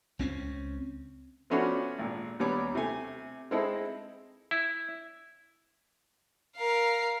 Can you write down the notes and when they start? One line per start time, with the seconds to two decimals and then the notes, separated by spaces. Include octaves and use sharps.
0.19 C#2 C4 C#4
1.50 F3 A3 B3 C#4 D4 F#4
1.99 G#1 A#2
2.40 D#2 G3 B3 C#5 D6
2.75 C3 A3 G#5
3.51 G#3 C4 D#4 E4 A4
4.51 E4
6.56 A#4 F5